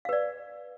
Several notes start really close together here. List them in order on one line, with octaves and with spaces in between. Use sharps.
F5 B4 D5